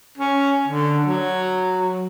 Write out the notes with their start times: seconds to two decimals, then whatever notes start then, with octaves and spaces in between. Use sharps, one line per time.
0.18 C#4
0.68 D3
1.04 F#3